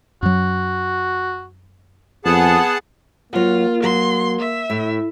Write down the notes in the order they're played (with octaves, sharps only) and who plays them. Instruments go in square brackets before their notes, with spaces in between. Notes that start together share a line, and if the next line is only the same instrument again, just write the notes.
[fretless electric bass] F#2 F#3 [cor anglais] F#4
[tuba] F2 [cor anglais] B3 [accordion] G#4 F#5 A5
[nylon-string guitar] F#3 F#5 [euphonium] A#3 [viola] F4
[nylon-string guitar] F#3 [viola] C6
[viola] E5
[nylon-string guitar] A2